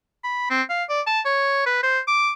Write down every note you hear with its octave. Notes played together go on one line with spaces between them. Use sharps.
B5
C4
F5
D5
A5
C#5
B4
C5
D6